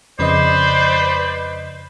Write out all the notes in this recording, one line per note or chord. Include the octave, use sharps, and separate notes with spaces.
F2 C#3 B4 C5 D5 D#5